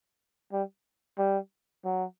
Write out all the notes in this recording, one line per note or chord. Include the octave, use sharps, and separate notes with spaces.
G3
G3
F#3